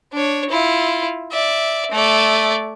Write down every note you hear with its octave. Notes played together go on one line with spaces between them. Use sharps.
D4 C#5
E4 F4
D5 E5
A3 D5